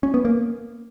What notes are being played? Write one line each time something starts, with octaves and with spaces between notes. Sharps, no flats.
C#4
B3
A#3